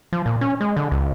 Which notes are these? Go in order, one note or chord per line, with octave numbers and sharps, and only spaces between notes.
F3
A#2
C#4
G#3
D3
C#2